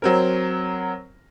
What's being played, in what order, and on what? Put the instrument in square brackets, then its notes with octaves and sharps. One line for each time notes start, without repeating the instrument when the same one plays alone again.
[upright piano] F#3 C4 A#4